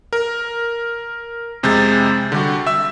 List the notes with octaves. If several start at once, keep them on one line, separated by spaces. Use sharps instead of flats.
A#4
F2 C3 G#3 G6 A6
D3 G3 F#4
E5 E6